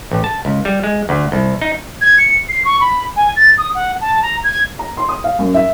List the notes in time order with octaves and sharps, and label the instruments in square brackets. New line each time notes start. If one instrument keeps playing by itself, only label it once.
[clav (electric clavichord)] A1
A5
C#2
G3
G#3
D2
C2
D#4
[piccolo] G#6
C#7
C7
C#6
B5
G#5
A6
D#6
F#5
A5
A#5
G#6
[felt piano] A#5
C6
D#6
F5
F#2
E5